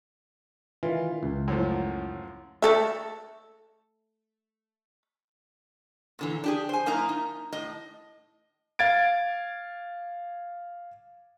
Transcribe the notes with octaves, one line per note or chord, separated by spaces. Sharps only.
D#3 E3 F4
C#2
F#2 A2 F3
A3 A4 E5
A#2 D3 E3
D4 G4 G#4
C5 G#5
F#2 A#3 D#4 E4 A#5
D#4
A2 D#5
F5 G#6 A6 D7